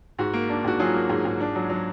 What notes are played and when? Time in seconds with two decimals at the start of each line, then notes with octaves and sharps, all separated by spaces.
0.19 G#2 F#4
0.34 A#3
0.49 D4
0.64 G#2 F#4
0.79 F#3 F4 G#4
0.94 A#3
1.09 G#2
1.25 G#2
1.40 D4
1.55 F#3
1.69 F#3